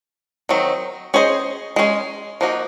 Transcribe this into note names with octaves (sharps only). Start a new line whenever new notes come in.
D#3 F#3 C4 D#4
C#4 G#4 C5 D#5
G#3 C#4 G#4
F3 A#3 D#4 F#4